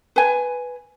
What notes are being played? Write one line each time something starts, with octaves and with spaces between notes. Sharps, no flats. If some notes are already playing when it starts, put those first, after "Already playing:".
B4 G#5